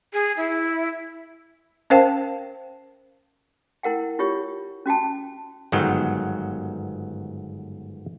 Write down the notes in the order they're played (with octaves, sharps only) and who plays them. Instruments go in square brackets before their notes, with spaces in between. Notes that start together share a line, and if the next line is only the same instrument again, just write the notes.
[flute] G#4
E4
[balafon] C#4 A#4 C5 F5 G5 A5
[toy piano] E4 A#4 F#5 G5
E4 F4 G4 C#5
C#4 F#4 G5 A5
[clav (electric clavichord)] G1 G#2 D#3 F#3 B3 G5